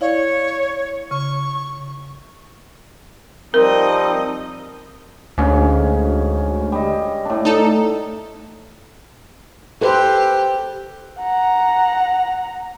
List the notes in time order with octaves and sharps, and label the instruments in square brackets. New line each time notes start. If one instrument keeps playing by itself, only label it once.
[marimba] E4 D5 F5 [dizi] C#5
[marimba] C#3 [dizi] C#6
[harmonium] F3 G3 [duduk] C4 [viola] D#4 D#5 [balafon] A#4
[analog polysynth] D2 [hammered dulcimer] G#2 C#4 F5
[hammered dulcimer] G3 D#5
A2 D4
[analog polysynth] D#4 A4
[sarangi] G4 [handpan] A4 B4 C5
[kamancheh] F#5 A#5